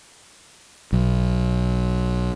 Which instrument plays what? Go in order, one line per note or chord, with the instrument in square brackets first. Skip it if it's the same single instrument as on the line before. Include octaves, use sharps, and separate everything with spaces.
[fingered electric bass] B1